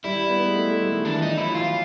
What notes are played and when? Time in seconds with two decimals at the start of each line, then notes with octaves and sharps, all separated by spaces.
0.04 G3 E4
0.29 B3
0.46 G#3
0.55 A3
0.68 G#3
0.80 G3
0.92 D#3
1.05 E3 D4
1.21 F3 D#4
1.38 F#3 E4
1.55 E3 F4